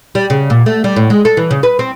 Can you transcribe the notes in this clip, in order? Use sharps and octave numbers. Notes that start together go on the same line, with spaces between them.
G3
C#3
A#2
A3
G3
A2
G#3
A4
E3
C#3
B4
C4